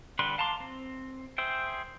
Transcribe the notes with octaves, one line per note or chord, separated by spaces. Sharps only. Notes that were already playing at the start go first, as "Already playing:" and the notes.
D3 G3 B4 C6
F5 A5 A#5 C6 D6
C4
G#4 C5 E5 G5